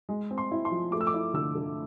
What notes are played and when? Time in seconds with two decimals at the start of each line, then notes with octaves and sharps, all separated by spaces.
0.09 G#3
0.31 C4
0.38 C6
0.52 E4
0.65 C6
0.71 F3
0.92 A3 D6
1.01 E6
1.07 D6
1.14 E4
1.34 D3 E6
1.55 D3